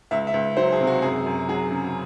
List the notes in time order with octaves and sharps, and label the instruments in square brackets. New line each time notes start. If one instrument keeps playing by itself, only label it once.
[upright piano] C#2 E5
E5
C#2
F#3 C5
G#4
C3
F#4
F#2 G#4
F#2
F#3 G#4
C#3